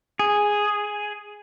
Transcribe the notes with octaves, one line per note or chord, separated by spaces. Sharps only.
G#4